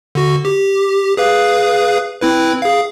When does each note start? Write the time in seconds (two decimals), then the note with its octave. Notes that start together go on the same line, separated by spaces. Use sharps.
0.15 D3 F#4
0.45 G4
1.17 G#4 B4 F5
2.21 C4 E4 B4
2.62 G#4 F5